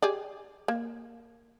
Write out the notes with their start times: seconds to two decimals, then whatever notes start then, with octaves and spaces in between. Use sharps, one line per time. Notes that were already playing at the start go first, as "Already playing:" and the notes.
0.02 G4 G#4 D5
0.68 A#3